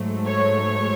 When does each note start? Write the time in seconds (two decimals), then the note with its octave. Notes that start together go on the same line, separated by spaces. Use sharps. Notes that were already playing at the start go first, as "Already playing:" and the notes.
Already playing: G#2 F#3 A3
0.26 C#5